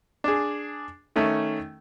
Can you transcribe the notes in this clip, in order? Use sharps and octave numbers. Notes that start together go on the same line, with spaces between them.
D4 G#4
D#3 A3 C#4